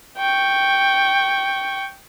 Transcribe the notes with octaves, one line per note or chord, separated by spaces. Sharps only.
G5 C#6